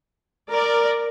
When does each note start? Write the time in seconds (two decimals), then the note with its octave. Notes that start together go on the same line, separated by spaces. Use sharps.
0.49 A#4 D5